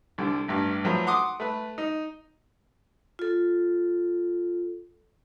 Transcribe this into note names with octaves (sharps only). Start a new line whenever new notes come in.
C2 D3
A1 G2
F3 F#3 A3 B4
F#5 C6 D6 D#6
A3 B4
D#4
F4 A4